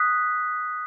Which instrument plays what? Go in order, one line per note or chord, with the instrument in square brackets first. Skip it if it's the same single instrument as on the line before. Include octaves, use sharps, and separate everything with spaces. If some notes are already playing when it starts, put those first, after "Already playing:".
Already playing: [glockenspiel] D#6 F#6 B6